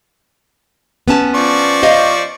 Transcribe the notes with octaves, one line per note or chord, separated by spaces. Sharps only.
B3 C#4 A5
F3 D5 C#6
C5 D#5 F5